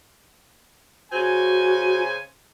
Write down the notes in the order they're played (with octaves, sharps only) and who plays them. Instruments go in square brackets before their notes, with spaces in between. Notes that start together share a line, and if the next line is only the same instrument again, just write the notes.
[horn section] C#3 C5 G#5 [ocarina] F#4